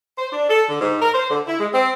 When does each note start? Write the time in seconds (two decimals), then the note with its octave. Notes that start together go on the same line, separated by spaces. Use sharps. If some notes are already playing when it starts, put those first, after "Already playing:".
0.18 C5
0.31 D4
0.49 A4
0.69 D3
0.80 G#2
1.01 A#4
1.13 C5
1.29 D3
1.46 E4
1.58 G#3
1.73 C4